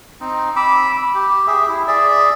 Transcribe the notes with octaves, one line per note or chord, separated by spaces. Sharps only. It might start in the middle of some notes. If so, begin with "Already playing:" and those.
C4 D#4
B5 D6 E6
G4
G#4 E5
E4
G#4 D5 E5